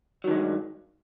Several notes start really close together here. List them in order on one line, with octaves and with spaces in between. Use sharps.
F#3 D#3 G#3 G2